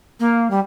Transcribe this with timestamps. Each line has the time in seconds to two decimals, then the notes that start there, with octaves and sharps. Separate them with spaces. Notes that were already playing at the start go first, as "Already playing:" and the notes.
0.20 A#3
0.50 G3